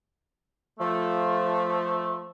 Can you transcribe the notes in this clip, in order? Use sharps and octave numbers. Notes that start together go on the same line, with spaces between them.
F3 A3